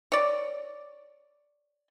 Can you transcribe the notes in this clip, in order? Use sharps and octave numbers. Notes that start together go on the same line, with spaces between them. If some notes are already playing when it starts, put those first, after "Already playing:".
C#5 D5